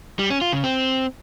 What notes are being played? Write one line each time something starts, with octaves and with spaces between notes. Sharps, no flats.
G3
C#4
F4
C#3
C4